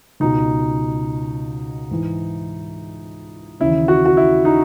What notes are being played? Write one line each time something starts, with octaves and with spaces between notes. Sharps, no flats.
C#2 B2 D#4
G#2 E3
D#2 C#3 E3 E4
F#4
F#4
E4
D#4